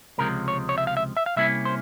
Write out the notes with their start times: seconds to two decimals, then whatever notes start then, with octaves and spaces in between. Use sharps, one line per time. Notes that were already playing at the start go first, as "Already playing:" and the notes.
0.18 C#2 C3 F3 G#3 A#4
0.48 C#5
0.69 C#5
0.78 E5
0.87 F5
0.97 E5
1.17 E5
1.26 F5
1.36 C3 G3 A#3 C#4 E4 E5
1.65 C5